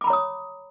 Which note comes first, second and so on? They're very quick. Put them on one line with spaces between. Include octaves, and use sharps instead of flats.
D6 B5 A#5 C#5 D#6